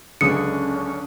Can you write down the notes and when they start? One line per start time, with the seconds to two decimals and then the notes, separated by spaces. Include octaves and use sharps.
0.21 C#2 D3 F#3 G#3 C#4 D4 D#6 C#7